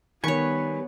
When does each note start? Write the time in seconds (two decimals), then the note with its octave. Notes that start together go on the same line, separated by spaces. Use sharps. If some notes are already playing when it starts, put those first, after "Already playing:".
0.24 D#3 G3 B3 B4 C#5 G#5 C#6